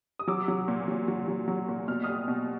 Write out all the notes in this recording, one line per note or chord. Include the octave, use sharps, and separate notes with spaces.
D#6
F#3 D6 E6
F#3
A#2
F#3
F#3
F#3
F#3
A#2
B2 F6
G3 D#6 F6
B2